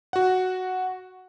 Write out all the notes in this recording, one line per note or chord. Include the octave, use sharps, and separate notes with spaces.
F#4 F#5